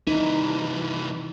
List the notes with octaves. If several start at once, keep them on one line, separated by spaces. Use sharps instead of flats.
C2 E3 D#4